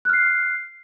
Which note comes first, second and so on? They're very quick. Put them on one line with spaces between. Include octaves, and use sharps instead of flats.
F#6 F6 C7